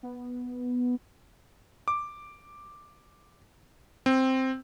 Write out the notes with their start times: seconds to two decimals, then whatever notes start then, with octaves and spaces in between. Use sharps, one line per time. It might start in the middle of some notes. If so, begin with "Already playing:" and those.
0.03 B3
1.88 D6
4.06 C4